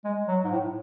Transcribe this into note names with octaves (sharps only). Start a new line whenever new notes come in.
G#3
F#3
G#2
A2